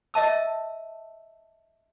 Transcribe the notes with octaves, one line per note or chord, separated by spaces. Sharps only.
D#5 E5 A5 E6